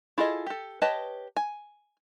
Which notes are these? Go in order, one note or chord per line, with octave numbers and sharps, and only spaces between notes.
E4 F4 G#4 A4 D#5
G4 A4
G4 B4 C#5 D#5 A5
G#5